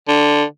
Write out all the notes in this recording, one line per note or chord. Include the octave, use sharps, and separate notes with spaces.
D3